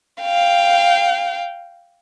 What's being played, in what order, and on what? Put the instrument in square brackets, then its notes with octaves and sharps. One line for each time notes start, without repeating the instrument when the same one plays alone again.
[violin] F5 G5